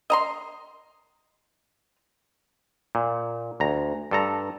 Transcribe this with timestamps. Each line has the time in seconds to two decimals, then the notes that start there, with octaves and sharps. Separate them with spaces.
0.10 D#5 A#5 C6
2.95 A#2
3.60 D2 A#5
4.11 G2 A4 A#5